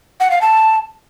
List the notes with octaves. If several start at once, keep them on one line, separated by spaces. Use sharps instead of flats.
F#5
F5
A5